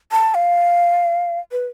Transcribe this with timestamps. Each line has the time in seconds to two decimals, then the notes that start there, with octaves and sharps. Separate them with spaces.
0.12 A5
0.35 F5
1.52 B4